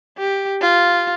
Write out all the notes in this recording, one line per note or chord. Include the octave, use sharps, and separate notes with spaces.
G4
F4